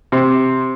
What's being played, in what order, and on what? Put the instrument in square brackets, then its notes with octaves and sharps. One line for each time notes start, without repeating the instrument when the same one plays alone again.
[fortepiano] C3